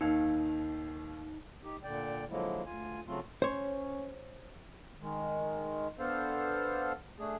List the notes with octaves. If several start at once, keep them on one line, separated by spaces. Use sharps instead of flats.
D#2 D#3 D#4 F5
D#4 G4
A#2 D3 D5 G5
D3 F3 F#3 G#3 A#3 E4
D2 F4 G#5
C#3 F#3 A3 C4 F4
C#4 C5 C#5
D#3 G#3
B3 D4 A4 C5 F5
A3 D4 G#4